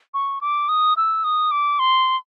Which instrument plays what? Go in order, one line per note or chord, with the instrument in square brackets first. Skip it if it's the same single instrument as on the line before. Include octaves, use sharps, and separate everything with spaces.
[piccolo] C#6
D6
D#6
E6
D#6
D6
C6